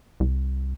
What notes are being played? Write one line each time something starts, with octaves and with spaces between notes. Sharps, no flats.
C2